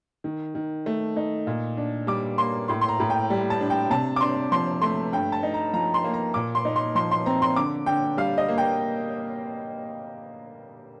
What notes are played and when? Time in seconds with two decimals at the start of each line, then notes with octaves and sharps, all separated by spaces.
0.24 D#3
0.55 D#3
0.86 A3
1.16 D#4
1.47 A#2
1.77 D4
2.07 G3 D6
2.38 A#3 C6
2.68 A2 C6
2.81 C6
2.88 A#5
3.00 A2
3.10 G5
3.30 G3
3.50 A5
3.61 D4
3.70 G5
3.90 C3 A5
4.16 D6
4.21 D4 C6
4.52 F3 C6
4.82 A3 C6
5.12 G2 G5
5.32 A5
5.43 D#4
5.54 A#5
5.73 F3 A#5
5.94 C6
6.04 A#3
6.14 A#5
6.34 A#2 D6
6.55 C6
6.65 D#4
6.76 C6
6.95 F3 C6
7.11 C6
7.26 C4 A#5
7.42 C6
7.56 D3 D6
7.86 D3 G5
8.17 G3 F5
8.38 D#5
8.48 A#3
8.58 G5